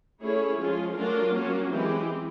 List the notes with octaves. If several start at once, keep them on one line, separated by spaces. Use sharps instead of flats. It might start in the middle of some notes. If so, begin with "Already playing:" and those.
A3 C#4 E4 G#4 C#5
F3 G#3 C#4 F4 G#4
F#3 A3 D4 F4 A#4
F#3 A#3 C#4
E3 G#3 C4 E4 G4